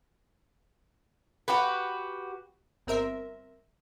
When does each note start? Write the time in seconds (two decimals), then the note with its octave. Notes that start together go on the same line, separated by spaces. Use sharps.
1.48 F#4 G4 B4
2.87 G1 C4 A#4 E5